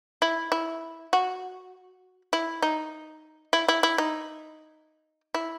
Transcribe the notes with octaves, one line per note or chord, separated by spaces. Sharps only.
E4
E4
F#4
E4
D#4
E4
E4
E4
D#4
E4